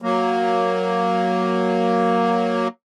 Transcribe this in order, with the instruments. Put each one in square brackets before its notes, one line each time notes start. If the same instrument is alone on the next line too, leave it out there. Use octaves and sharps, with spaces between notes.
[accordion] F#3 A#3